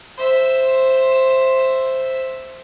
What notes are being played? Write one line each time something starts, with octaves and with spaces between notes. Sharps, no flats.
C5 E5